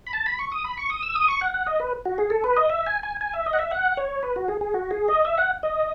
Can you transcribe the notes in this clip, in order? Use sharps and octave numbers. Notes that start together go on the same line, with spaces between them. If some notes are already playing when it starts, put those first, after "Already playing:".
B5
A5
B5
C#6
D#6
B5
C#6
D#6
E6
D#6
C#6
F#5
F#5
D#5
B4
F#4
G#4
A4
B4
D#5
E5
G#5
G#5
G#5
E5
D#5
F#5
E5
F#5
C#5
B4
F#4
G#4
G#4
F#4
G#4
D#5
E5
F#5
D#5